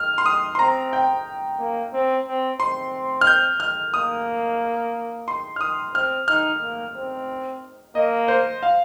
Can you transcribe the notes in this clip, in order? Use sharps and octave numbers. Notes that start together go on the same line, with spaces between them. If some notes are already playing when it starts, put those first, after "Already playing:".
Already playing: F6
C6
D#6
C6
C4 A#5
G5
A#3
C4
C4
C4 C6
F6
G6
F6
A#3 D#6
C6
F6
D#6
C4 F6
D#4 F6
A#3
C4
A#3 D#5
C5
F5